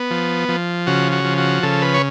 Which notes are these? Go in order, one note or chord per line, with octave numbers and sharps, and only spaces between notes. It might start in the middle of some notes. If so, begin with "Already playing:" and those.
Already playing: B3
F3
F3
C#3 F#4
F#4
F3
F#4
C#3 A4
B4
C#5